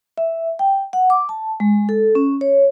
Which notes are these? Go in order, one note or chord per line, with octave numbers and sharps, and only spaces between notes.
E5
G5
F#5
D6
A5
G#3
A4
C#4
C#5